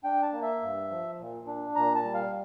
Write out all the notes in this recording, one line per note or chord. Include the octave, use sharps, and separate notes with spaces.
D4 G5
A5
A#3
E5
G2
F3
A#2
D4
A#2 A#5
A5
G3
F5